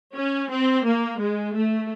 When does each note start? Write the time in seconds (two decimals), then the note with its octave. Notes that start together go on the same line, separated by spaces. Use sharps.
0.15 C#4
0.50 C4
0.85 A#3
1.19 G#3
1.54 A3